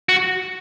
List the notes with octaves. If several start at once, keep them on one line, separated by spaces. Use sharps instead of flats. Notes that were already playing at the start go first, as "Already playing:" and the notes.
F#4